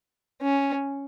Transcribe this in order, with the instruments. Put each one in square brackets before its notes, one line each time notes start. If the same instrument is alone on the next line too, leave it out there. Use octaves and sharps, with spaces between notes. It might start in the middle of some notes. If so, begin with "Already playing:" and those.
[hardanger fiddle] C#4